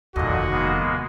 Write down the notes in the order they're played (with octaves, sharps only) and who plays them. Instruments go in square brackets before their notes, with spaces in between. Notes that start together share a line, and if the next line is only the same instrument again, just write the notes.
[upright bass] F1 D#2 [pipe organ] A#2 D3 D#5 [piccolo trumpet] F#4
[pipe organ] G#3 A#3 B3